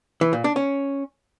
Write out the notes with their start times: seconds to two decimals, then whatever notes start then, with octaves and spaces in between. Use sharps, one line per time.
0.21 E3
0.33 A#2
0.44 D4
0.56 C#4